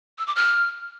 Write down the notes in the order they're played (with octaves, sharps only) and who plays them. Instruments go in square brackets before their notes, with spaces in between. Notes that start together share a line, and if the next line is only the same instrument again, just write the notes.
[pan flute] E6
D6
F6